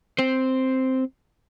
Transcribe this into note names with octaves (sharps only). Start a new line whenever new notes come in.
C4 C5